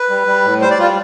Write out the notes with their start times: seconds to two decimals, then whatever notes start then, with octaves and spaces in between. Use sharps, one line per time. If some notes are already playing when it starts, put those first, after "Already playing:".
Already playing: B4
0.09 G3
0.27 G3
0.45 A2
0.61 G3 C5
0.71 D5
0.79 G3 F4